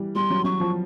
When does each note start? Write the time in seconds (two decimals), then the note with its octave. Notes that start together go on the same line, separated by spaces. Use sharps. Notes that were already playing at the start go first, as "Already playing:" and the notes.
Already playing: E3 G3
0.15 G3 C6
0.30 F#3
0.44 F#3 C#6
0.60 F3